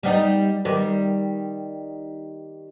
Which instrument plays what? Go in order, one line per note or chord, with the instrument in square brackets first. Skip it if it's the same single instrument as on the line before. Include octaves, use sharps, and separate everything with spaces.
[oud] G3 B3 D#4
D#3 G3 B3